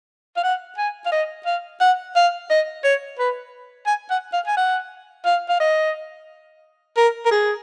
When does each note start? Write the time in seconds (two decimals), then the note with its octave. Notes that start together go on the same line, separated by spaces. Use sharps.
0.37 F5
0.44 F#5
0.78 G#5
1.06 F5
1.12 D#5
1.46 F5
1.81 F#5
2.16 F5
2.50 D#5
2.84 C#5
3.19 B4
3.87 G#5
4.11 F#5
4.33 F5
4.47 G#5
4.57 F#5
5.26 F5
5.49 F5
5.60 D#5
6.97 A#4
7.26 A#4
7.31 G#4